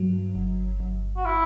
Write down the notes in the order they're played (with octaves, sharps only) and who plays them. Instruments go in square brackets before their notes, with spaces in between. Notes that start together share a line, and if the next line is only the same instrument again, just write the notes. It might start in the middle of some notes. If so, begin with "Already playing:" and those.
Already playing: [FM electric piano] G2 F#3
G1
G1
[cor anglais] F#4
E4